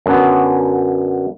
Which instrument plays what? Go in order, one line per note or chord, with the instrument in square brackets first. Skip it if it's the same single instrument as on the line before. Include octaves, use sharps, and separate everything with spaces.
[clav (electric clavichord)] F#2 D3 F#3 B3